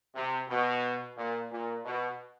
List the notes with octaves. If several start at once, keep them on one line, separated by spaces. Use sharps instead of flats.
C3
B2
A#2
A#2
B2